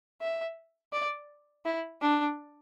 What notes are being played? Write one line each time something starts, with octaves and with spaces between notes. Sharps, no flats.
E5
D5
E4
D4